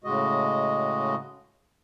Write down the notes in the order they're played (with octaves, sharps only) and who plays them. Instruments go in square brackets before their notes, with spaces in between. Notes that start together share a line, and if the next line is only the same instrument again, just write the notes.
[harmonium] A2 C#3 G#3 F#4 D#5